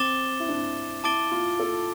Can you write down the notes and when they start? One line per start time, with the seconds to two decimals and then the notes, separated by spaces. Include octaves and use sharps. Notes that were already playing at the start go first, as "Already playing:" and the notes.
Already playing: C4 D6 A6 E7 G7
0.40 E4
0.49 D4
1.04 E4 A5 D6 A6 D7 G7
1.31 F4
1.60 A4